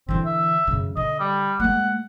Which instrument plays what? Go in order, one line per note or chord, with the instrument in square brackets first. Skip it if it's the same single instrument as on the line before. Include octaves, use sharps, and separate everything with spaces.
[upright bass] D3 E3 [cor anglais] C4
[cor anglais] E5
[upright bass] F#2 C#3
[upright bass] D3 [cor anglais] D#5
[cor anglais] G3
[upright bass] G#3 A#3 [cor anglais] F#5